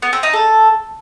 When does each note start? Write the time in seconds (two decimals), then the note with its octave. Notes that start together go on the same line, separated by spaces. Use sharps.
0.02 B3
0.13 C4
0.23 D#4
0.33 A4